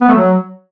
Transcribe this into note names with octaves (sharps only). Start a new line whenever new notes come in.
B3
A3
F#3